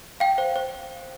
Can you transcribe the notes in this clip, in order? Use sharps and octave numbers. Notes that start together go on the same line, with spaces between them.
F5 G5
C5
C5